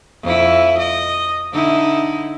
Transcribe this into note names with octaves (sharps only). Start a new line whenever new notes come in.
F2 E4
D#5
D3 D#4 E4